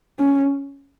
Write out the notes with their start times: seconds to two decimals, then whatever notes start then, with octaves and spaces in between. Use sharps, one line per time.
0.19 C#4